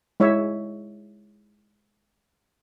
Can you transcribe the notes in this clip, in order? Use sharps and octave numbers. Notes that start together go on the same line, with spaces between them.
G#3 E4 C#5 E5